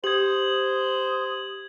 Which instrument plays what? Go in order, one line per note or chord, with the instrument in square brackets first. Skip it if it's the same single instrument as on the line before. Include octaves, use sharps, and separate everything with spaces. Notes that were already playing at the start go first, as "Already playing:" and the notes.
[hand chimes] G4 [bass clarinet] C5 [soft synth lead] D#6 [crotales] G#6 F#7